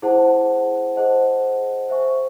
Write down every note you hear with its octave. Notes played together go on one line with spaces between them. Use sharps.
E4 G#4 C5 F#5 A5
G#4 C5 D#5 F#5 A5
G#4 C5 E5 G#5 C#6